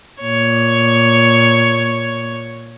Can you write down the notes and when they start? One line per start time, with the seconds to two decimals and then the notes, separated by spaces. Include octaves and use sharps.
0.22 A#2 C#5